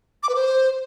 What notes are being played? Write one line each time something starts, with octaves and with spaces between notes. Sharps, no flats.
D6
B4
C5